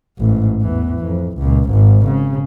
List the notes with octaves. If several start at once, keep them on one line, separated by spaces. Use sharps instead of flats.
A1 G#2
E2 E3
F2
C#2 A#2
G#1 G#2
C#3